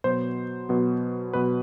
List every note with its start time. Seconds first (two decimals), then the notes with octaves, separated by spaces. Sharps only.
0.04 B2 F#3 B3 C5
0.69 B2 F#3 B3
1.33 B2 F#3 B3 B4